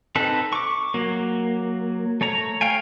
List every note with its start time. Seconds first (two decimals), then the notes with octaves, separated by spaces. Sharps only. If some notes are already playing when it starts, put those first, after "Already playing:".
0.15 C4 D#4 A4 B4
0.53 C#6 D6
0.94 F#3 A#3
2.21 A3 C#5 A#5
2.61 C#5 F5 G5 G#5